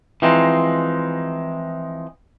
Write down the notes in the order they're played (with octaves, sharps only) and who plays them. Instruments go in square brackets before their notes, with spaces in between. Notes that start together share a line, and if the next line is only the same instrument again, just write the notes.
[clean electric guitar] E3 F3 G#3 C4 D#4